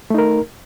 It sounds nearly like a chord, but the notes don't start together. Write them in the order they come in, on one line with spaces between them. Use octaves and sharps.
A3 D#4 A#4